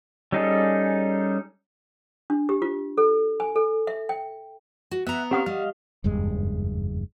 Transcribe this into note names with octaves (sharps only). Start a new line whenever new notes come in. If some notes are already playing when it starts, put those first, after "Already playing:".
G3 C#4 D#4 G#4 A4
D4
G4
F4
A4
G#5
A4
E5
G5
F#4
B3 E5 F#5 A#5
C4 C#4 G4 F5 F#5 D#6
G3 D#5 F5
F#1 E2 G2 G#3